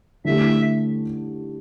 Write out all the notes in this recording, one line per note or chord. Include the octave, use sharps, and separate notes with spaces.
D3 A3 E4 G4 E5